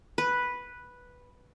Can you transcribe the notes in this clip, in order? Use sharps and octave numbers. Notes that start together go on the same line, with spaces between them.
B4